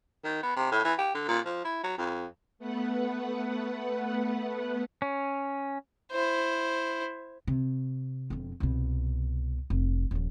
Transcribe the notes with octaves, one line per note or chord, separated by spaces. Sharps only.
D#3
B3
C3
A2
E3
G4
D3
A#2
F3
E4
F#3
F2
A3 B3 B4 F#5
C#4
E4 C5
C3
E1 F2
C2 B2
F1
D#1 F3